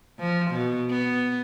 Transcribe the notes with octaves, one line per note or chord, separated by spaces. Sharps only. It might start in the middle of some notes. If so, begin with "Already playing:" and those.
F3
B2
B3